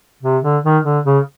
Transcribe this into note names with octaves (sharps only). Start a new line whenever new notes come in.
C3
D3
D#3
D3
C#3